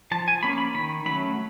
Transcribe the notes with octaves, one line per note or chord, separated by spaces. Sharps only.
F3 A5
G#5
A#3 C#4 B5
B5
D#3 B5
F#3 A3 C#4 B5